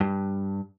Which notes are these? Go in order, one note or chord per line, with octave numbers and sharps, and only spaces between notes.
G2